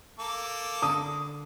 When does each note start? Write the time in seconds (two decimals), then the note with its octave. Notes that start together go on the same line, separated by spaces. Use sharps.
0.19 A#3 A4 D6
0.82 D3 D#6